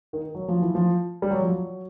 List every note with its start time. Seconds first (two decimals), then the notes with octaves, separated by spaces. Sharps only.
0.13 D#3
0.35 F#3
0.48 F3
0.62 E3
0.75 F3
1.22 G3
1.31 F#3
1.40 F3
1.48 F#3